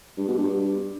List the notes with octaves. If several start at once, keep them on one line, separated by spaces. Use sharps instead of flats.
G2
B2
G2